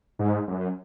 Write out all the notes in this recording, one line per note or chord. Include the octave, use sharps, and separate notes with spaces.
G#2
F#2